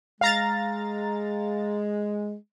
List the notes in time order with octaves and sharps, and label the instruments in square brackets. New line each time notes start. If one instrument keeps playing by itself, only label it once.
[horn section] G#3 [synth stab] F5 A#5 A6